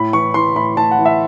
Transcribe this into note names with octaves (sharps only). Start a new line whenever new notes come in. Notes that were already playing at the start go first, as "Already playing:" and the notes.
Already playing: A2 B5
E3 C#6
E3 C6
A2 B5
A2 A5
F#5
E3
E5